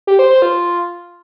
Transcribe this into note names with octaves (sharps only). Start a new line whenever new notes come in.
G4
C5
C5
F4